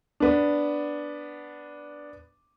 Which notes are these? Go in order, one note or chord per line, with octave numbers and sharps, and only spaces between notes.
B3 D4